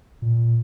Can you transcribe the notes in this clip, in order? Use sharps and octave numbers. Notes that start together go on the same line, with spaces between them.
A#2